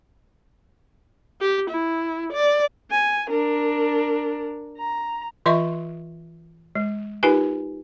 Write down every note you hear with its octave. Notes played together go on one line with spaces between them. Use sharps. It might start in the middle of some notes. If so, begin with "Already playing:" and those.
G4
E4
D5
G#5
D4 A#4
A#5
E3 F4 D#5 E5 C6 C#6
G#3
D#4 F4 G4 A#4 B4 G#5